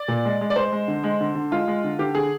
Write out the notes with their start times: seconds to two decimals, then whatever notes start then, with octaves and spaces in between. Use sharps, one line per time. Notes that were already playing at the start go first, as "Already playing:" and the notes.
Already playing: D5
0.08 A#2
0.25 G#3
0.41 G#3
0.50 D5
0.56 G#3 C5
0.72 G#3
0.88 D3
1.04 G#3
1.21 D3
1.35 D3
1.51 G#3 F4
1.68 G#3
1.84 D3
1.99 D3 G4
2.15 D3 G#4